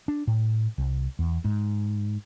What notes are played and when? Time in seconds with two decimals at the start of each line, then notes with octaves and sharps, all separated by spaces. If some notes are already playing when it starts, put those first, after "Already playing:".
0.08 D4
0.27 A2
0.78 C2
1.19 E2
1.45 G#2